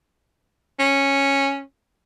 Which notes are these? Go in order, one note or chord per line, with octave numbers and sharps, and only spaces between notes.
C#4